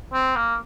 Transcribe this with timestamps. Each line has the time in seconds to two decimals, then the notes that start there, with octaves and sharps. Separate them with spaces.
0.13 C4
0.36 A#3